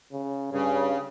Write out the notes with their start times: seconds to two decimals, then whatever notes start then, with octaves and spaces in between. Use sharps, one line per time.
0.12 C#3
0.52 G2 C#3